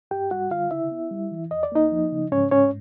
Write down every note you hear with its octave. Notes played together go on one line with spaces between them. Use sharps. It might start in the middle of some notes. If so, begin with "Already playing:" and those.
G2 G4 G5
G3 F#4 F#5
D3 F4 F5
C#3 E4 E5
B3
G3
E3
E2 D#5
D5
A#3 D#4 D#5
F3
C#3
G#2 C#4 C#5
G#2 C#4 C#5